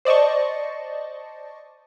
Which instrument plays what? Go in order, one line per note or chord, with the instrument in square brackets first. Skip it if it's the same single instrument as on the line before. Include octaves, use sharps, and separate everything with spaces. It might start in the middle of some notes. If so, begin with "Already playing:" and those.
[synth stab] C5 D5 D#5 A5 C#6